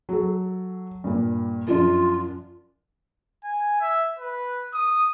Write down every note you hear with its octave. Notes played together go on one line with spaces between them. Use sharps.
F#3 A4
G2 A#2
F#2 F3 D4 F4
G#5
E5
B4
D#6